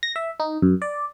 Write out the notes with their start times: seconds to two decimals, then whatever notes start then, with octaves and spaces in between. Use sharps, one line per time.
0.03 A#6
0.16 E5
0.40 D#4
0.62 F#2
0.82 D5